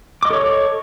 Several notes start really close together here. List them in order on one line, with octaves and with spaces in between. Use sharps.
D6 D#5 C#6 A4 C#5